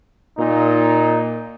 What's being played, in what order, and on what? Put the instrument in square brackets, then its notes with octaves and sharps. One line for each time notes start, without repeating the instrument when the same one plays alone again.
[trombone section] A#2 D#4